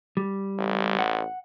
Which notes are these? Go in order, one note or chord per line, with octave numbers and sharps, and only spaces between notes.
G3
A1
F#5